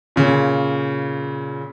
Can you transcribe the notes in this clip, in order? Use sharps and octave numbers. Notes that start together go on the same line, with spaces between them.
A#2 C#3